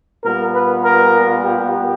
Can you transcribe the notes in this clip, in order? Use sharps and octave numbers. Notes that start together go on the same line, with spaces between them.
A#2 G3 B3 A#4
B4
A#4
G4